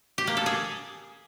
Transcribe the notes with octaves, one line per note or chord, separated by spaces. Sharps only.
G4
A#3
A4
G#4